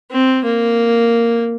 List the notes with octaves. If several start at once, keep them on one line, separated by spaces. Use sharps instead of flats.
C4
A#3